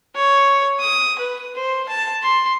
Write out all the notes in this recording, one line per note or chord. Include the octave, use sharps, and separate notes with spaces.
C#5
D#6
B4
C5
A5
C6